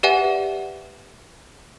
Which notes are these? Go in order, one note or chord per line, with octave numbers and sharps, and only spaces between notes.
G4 B4 D5 E5 F#5 G#5